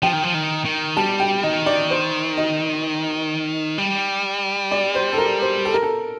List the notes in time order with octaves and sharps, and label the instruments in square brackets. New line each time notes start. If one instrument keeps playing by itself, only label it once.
[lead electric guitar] F3 [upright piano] G5
[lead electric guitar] D#3
F3
D#3
D#3
[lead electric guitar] G3 [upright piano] A5
[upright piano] G5
[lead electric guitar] D#3 [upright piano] D#5
[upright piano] D5
C5
D#5
[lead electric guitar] G3
[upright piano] D5
C5
A4
A#4
C5
A4
A#4
A4